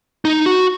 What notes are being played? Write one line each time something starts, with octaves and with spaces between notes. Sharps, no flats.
D#4
F#4